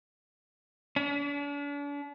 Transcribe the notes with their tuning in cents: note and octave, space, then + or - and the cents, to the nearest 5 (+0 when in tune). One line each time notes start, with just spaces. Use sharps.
D4 -40